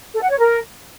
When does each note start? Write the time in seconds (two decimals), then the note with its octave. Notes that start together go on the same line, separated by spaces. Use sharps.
0.13 A4
0.22 F#5
0.30 C#5
0.39 A#4